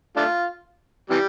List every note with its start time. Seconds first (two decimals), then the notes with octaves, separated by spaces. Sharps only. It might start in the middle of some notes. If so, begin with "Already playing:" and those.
0.16 A3 D4 F4
1.10 C3 E3 G3